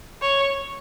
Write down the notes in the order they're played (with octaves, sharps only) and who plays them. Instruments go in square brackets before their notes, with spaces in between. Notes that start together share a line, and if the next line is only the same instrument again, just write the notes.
[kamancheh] C#5